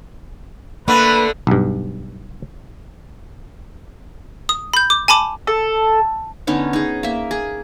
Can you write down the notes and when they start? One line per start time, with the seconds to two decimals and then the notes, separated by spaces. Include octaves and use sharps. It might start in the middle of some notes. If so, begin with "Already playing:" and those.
0.88 D3 A3 A#3 B4 B5
1.47 B1 G2
4.49 D#6
4.74 B5 G6
4.90 D6
5.08 G#5 A5 B5 D6
5.47 A4
6.47 D3 B3 C#4 D#4
6.73 D#4 G#4
7.03 A#3 E5
7.31 G#4